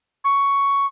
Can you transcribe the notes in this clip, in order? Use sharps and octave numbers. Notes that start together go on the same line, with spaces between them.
C#6